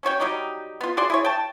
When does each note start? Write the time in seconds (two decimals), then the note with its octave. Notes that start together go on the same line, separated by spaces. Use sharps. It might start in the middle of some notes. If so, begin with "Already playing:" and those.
0.03 C#4 F#4 C#5 G5
0.20 F#3 G3 D#4 G4
0.81 B3 F4
0.97 F#4 G#4 D5 C6
1.10 E4 G#4 C#5
1.25 G5 A5